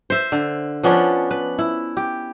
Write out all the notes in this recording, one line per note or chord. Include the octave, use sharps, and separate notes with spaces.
C5 E5
D3
F3 B3 C#4 D4
B4
E4
G4